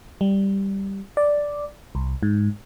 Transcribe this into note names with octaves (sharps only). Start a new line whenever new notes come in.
G3
D5
C2
G#2